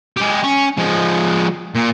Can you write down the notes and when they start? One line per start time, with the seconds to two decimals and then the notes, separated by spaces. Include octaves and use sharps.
0.17 G#3 G4
0.43 C#4
0.78 F3 G#3
1.75 A#2